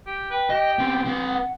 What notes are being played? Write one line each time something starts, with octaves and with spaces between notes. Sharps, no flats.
G4
B4 G5
G4 D#5
B3 C4
C4 B4
F#5